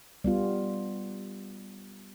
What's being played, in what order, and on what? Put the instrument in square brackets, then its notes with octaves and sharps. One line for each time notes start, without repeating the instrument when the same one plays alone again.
[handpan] G3 B3 F4